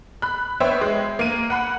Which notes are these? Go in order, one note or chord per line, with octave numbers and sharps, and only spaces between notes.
B5 F#6
B3 C5 C#5 E5 G5
G#3
A#3 D#7
F#5 B5 F#6